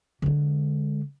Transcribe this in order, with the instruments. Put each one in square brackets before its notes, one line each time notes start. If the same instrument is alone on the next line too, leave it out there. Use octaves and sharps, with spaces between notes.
[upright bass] D3 G#3